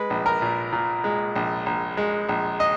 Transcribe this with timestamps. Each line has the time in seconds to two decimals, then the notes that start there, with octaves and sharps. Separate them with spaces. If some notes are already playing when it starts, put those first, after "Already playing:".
Already playing: G#3 B4
0.10 A#1
0.26 A#4
0.42 A#2
0.72 A#2
1.04 G#3
1.36 A#1
1.66 A#1
1.97 G#3
2.29 A#1
2.60 D#5